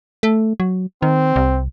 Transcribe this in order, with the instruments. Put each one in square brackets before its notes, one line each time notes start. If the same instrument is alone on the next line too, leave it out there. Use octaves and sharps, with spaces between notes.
[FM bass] A3
F#3
[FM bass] D#3 [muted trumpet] C4
[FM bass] C2